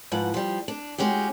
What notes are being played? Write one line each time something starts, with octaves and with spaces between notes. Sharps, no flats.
G#2 F3 B4 F#5
F3 G3
D4
G#3 C#4 F#4 G4